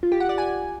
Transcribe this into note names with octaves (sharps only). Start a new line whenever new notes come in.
F4
G4
F#5
D5
G#5